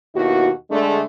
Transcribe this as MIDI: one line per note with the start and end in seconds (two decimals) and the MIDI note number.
0.15 0.49 39
0.15 0.49 47
0.15 0.49 64
0.15 0.49 66
0.71 1.01 50
0.71 1.01 56
0.71 1.01 57